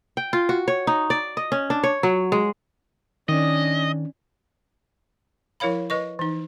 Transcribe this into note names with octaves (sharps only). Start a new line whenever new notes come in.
G5
F4
F#4
C#5
D#4
D5
D#5
C#4
D4
C#5
F#3
G#3
D#3 C#4 D4 D#5
F3 E4 A#4 C#5 F5 B5
B4 D#5 C#6
E3 D#4